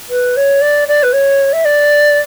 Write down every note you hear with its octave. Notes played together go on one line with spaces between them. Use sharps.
B4
C#5
D5
D5
B4
C#5
E5
D5